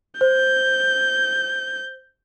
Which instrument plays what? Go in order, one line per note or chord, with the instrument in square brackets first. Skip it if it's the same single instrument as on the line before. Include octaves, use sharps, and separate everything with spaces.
[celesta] C5 [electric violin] G6